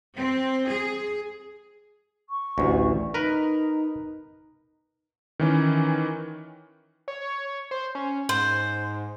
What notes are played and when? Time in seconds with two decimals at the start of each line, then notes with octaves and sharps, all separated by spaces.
0.17 C4
0.71 G#4
2.29 C#6
2.58 A1 D2
3.14 D#4 A#4 B4
5.39 D#3 E3 C#4
7.08 C#5
7.71 C5
7.95 C#4
8.29 G#2 C5